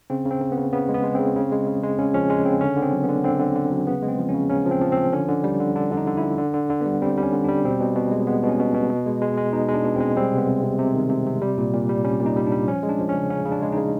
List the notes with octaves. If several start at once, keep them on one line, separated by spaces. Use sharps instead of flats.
C#3 C4
C#3
C4
C#3
B3
C#3
C#3 B3
G#3
B3
G#3
C#3 C4
C#3
G#3
C#3
G#3
C#3 C#4
F3 C#4
G#3 C#4
C#3 C4
D3 C#4
D3
C4
F#3
B3
D3
D3 C4
D3
D3
F#3
C#3 B3
G#3
C4
F3
C#4
C#3
C#3 C#4
F3
C4
F3
C4
F3
D3 C#4
D3
G3
D3
D3 D4
D3
D#4
D3
E4
D3
D3
D3
D3
G3 B3
G3 C4
G3
C#4
D3
G3 D4
B2 C4
B2
B2
G#3
G#3 B3
B2
C#4
B2
B2
B2
G#3
G#3
G#3
B2 D#4
G#3
D4
B2
G#3 C4
G3 C4
C3
B3
C3
C3
C3
D#3
C3
C3
G3
A#2
A#2
G3
G3 C#4
A#2
D#4
G3
D4
G3
F3 C#4
G#3
D4
F3
C#4
C#3
C#3 C#4
C#3
D4
G#3
D#4
C#3